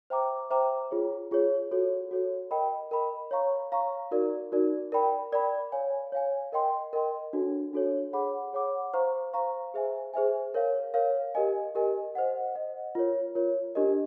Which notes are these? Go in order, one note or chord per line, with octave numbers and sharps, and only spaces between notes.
C5 E5 G5 A#5 D6
C5 E5 G5 A#5 D6
F4 G#4 C#5
F4 G#4 C#5
F#4 A4 C#5
F#4 A4 C#5
A#4 D#5 G5 B5
A#4 D#5 G5 B5
C#5 F5 A#5 C#6
C#5 F5 A#5 C#6
D#4 F#4 A#4 D5
D#4 F#4 A#4 D5
A#4 D5 G5 B5
A#4 D5 G5 B5
C#5 F5 G#5
C#5 F5 G#5
A#4 D#5 G5 C6
A#4 D#5 G5 C6
D4 F#4 A4 C#5
D4 F#4 A4 C#5
G#4 C#5 F#5 B5 D6
G#4 C#5 F#5 B5 D6
C5 F5 A#5 C#6
C5 F5 A#5 C#6
G#4 C5 E5 G#5
G#4 C5 E5 G#5
A#4 C#5 F5
A#4 C#5 F5
G4 A#4 D#5 G#5
G4 A#4 D#5 G#5
C5 D#5 F#5
C5 D#5 F#5
F4 A#4 C#5
F4 A#4 C#5
D4 G4 A#4 D#5